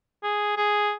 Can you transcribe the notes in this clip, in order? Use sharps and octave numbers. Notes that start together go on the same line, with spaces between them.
G#4
G#4